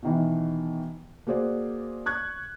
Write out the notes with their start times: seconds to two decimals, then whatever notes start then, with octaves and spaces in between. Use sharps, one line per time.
0.03 B2 D#3 E3
1.27 A#3 F#4 G#4 C5 D5
2.06 C#6 F#6 G#6